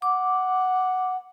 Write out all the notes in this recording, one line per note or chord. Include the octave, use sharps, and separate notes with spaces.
F#5 D6